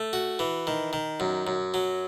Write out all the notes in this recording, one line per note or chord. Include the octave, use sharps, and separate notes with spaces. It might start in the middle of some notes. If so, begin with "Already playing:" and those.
Already playing: A3
F#4
E3
D#3
D#3
F#2
F#2
F#3